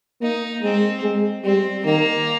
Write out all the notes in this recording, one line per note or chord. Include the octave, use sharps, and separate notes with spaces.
A#3 D#4
G#3 C4
G#3
G3 C4
D#3 A#3